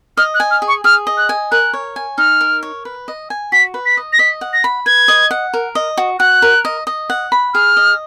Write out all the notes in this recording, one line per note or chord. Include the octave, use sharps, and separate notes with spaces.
D#5 F6
F#6
G#5
F6
G#4
C#6
G#4 F6
D#5
F#6
G#5
A#4 F#6
C#5
G#5
D#4 F6
A#4
C#5
B4
D#5
G#5
F#4 B6
B4
B6
D#5
A#6
D#5 B6
F#5
A#6
B5
B4 G#6
D#5
F#5
A#4
D#5
F#4
F#4 F#6
A#4
D#5
D#5
F#5
B5
G#4 F6
D#5